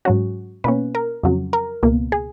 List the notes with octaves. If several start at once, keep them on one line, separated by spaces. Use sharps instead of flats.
G#2 F#3 C#4 F#4
B2 A#3 C#4 B4
A#4
F2 C#3 F#3
A#4
C#2 B2 A#3
G#4